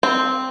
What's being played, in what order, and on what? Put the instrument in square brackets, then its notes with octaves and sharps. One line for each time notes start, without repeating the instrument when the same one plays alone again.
[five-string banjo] C4